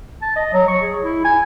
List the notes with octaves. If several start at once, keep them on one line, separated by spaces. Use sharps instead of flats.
A5
D#5
F#3
C#6
G#4
E4
G#5